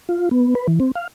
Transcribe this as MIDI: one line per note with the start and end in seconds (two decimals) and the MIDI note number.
0.09 0.29 65
0.31 0.54 59
0.55 0.67 71
0.68 0.79 52
0.80 0.92 60
0.95 1.08 77